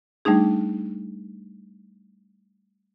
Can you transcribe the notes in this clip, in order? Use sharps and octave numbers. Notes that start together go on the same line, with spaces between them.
G3 A3 D4 D#4 G#4